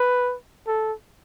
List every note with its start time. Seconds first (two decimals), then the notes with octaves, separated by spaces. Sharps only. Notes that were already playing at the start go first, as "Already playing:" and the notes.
Already playing: B4
0.67 A4